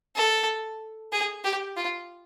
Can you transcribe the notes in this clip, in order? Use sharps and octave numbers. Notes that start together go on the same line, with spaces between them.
A4
G#4
G4
F4